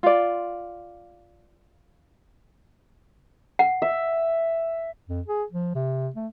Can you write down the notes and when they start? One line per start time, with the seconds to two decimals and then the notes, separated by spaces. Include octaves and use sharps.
0.03 F4 D5
3.59 F#5
3.82 E5
5.09 F2
5.28 G#4
5.52 F3
5.75 C3
6.16 A3